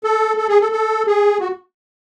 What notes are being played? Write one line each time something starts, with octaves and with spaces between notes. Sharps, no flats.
A4
A4
G#4
A4
A4
G#4
F#4